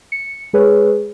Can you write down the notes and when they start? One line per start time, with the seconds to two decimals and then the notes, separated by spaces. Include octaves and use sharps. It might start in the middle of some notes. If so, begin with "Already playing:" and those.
0.12 C#7
0.53 G#3 G#4 B4 C#5